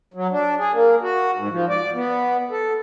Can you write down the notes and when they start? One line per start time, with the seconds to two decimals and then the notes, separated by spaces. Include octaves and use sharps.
0.14 F#3
0.31 D4
0.58 G#4
0.72 A#3
1.02 F#4
1.37 G#2
1.51 F3
1.69 D5
1.94 B3
2.51 A4